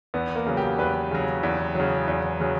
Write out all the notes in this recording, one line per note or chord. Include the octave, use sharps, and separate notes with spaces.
E2 B3
A#3
C#3 F#3
G4
E2 B4
C#3 F#3
E2
C#3 F#3
E2
C#3 F#3